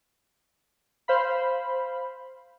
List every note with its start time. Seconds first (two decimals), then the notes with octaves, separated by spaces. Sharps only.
1.08 C5 F5 B5